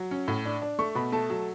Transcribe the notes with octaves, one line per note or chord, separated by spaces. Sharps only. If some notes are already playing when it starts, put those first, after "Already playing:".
Already playing: F#3
C#4
A2
D4
D4
A3 C#6
B2 B5
A3 A5
F#3